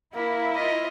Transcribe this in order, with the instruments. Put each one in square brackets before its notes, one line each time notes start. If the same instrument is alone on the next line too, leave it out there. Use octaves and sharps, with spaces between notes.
[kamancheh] A#3 [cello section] E4
[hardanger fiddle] F4 D#5